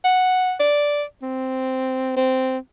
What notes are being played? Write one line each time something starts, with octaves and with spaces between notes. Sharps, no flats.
F#5
D5
C4
C4